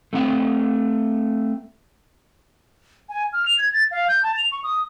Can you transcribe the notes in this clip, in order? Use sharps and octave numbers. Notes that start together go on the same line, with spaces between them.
A3 C4 F#5
G#5
F6
F7
G#6
A6
F5
G6
A5
F7
C#6
D#6